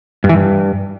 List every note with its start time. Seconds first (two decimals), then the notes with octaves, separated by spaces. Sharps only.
0.24 G2
0.29 E3
0.35 G2